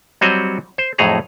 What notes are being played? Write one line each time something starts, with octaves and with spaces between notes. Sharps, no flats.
F#3 G3 C4 F#4 C#5 D#5
C5
F2 A2 F#3 D#4 G#4 A#5